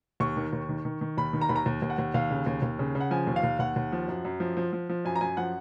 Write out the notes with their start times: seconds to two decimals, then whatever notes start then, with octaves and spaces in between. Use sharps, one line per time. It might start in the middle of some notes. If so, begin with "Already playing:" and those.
0.20 D#2 C#6
0.37 D#3
0.53 D#2
0.69 D#3
0.85 D#3
1.01 D#3
1.17 D#2 B5
1.33 D#3
1.41 A#5
1.49 D#2 B5
1.56 A#5
1.66 D#2
1.82 D#2
1.90 F#5
1.98 D#2
2.14 D#2 F5
2.31 C#3
2.46 D#2
2.62 D#2
2.79 C#3
2.95 C#3
3.00 F#5
3.11 F3 G#5
3.27 D#2
3.36 F5
3.43 D#2
3.59 D#2 F#5
3.76 D#2
3.92 F3
4.08 F#2
4.25 F#2
4.40 F3
4.57 F3
4.73 F3
4.89 F3
5.05 F#2 G#5
5.16 A#5
5.21 F#2 G#5
5.37 F3 F#5